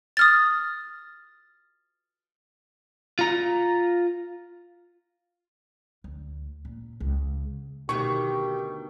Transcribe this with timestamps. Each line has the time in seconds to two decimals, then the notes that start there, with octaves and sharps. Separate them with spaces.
0.17 D#6 F6 A6
3.19 F4 A#5
6.04 D2
6.65 A#2
7.00 C#2
7.89 D2 B2 D#3 G4 C#6